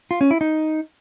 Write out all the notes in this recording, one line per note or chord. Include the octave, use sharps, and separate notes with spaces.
F4
C#4
E4
D#4